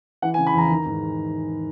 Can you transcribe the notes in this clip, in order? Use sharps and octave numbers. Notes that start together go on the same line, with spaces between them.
E3 F#5
G#5
C#3
B5
E2 A#5
D#3
G#2